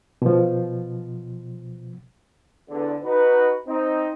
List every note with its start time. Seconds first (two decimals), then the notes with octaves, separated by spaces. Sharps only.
0.22 B2 F3
2.69 E2 D3
3.02 D#4 F#4 B4
3.66 C4 D#4